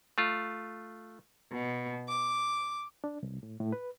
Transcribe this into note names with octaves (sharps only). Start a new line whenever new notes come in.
A3 F4
B2
D6
D4
C2
A2
A2
B4